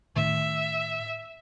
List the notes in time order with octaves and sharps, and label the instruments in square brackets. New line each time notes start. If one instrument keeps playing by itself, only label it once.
[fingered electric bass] A2 D#3 [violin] E5